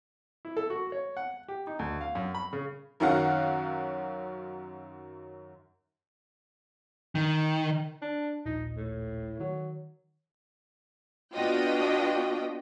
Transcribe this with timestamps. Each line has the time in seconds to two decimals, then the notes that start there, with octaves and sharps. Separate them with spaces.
0.45 E4
0.57 A4
0.70 F#4
0.92 C#5
1.17 F#5
1.48 G4
1.67 D#4
1.79 D2
2.01 F5
2.15 F#2
2.35 B5
2.53 C#3
3.00 F#2 D#3 F#3 F5 F#5
7.15 D#3
8.02 D4
8.45 A#1 D#2 A#2 D#4
8.77 A2
9.40 D#3 F#3
11.34 B3 D4 F4 F#4 D#5 G5